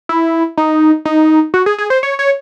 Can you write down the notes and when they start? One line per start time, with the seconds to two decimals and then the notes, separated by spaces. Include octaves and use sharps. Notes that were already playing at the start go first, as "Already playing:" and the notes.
0.09 E4
0.58 D#4
1.05 D#4
1.54 F#4
1.66 G#4
1.78 G#4
1.90 C5
2.03 C#5
2.19 C#5